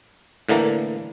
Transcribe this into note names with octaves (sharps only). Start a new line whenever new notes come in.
A2 D3 E3 A#3